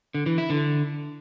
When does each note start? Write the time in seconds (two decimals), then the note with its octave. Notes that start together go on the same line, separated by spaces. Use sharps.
0.14 D3
0.26 E3
0.38 E4
0.50 D3